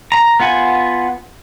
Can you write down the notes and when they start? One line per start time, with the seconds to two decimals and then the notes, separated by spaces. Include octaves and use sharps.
0.12 A#5
0.40 B3 F4 F#5 G#5